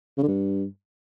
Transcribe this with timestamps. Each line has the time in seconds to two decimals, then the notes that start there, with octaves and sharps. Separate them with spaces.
0.18 C#3
0.23 D3
0.28 G2